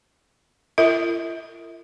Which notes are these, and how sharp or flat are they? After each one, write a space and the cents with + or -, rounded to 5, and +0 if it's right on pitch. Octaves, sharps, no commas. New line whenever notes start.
F4 -45 A#4 -35 E5 -30